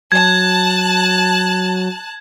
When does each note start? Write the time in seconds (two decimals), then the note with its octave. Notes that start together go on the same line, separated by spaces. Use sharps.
0.12 F#3 A5 F#6 G#6